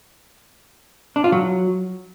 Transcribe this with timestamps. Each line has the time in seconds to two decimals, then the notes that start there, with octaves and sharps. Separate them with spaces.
1.16 D4
1.24 F4
1.32 F#3